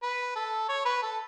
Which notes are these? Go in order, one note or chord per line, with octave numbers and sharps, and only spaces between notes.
B4
A4
C#5
B4
A4